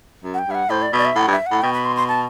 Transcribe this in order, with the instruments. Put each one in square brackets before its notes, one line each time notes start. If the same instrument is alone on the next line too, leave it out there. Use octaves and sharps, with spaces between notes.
[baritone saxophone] F#2
[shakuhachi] F#5
G5
[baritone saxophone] G2 [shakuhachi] E5
[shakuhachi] F#5
[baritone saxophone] A2 [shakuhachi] C5
[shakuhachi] D5
[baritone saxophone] B2 [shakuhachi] D5
[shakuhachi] E5
[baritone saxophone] A2 [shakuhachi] F#5
[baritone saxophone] G2
[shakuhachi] E5
[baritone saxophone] A2 [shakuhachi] F#5
[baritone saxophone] B2 [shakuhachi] G5
[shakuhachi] B5
C6
C6
A5